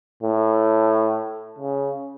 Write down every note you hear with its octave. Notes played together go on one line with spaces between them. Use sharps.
A2
C#3